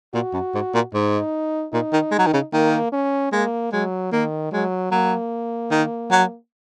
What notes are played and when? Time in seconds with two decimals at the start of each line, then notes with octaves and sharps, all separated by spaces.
0.14 A#2 F#4
0.33 F#2
0.54 G#2
0.74 A#2
0.94 G#2 D#4
1.73 A#2 D#4
1.93 D#3
2.11 G#3
2.19 F#3
2.26 D#3
2.33 C#3
2.53 D#3 A#3
2.92 C#4
3.32 G#3 A#3
3.72 F#3 G#3
4.12 D#3 A#3
4.52 F#3 G#3
4.91 F#3 A#3
5.71 D#3
6.11 F#3